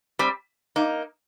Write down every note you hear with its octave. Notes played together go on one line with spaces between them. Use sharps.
G3 C4
A#3 D#4